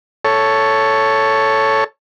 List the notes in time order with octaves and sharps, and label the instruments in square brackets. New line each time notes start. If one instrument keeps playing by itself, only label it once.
[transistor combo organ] A4 C#5